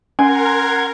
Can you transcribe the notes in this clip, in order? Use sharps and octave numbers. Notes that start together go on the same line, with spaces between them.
C#4 A#4 F#5 G#5 C6 G#6